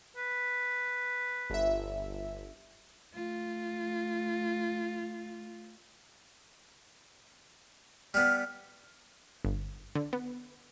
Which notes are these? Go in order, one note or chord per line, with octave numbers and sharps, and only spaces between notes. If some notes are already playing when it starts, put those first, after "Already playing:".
B4
G1 E5
A3 F4
G3 B3 F6
G1
D3
B3